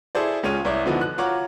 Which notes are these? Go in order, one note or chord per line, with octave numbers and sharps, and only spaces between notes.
E4 G#4 A4 C5 D5
C#2 G#3 C#4 F4 C#5 D#7
C2 E4 C#5 D5
D3 E3 F3 B3 D#4 F#4
F#6
F4 F#4 C#5 F#5 A#5 D6